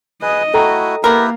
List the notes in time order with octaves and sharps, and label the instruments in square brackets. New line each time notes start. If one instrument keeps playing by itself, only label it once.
[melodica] G#4 B4 [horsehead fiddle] D#5
[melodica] A3 E4 F#4 [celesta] A4 G5 A#5
[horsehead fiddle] A#3 [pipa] B3 A#4 [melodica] E4 G4 B4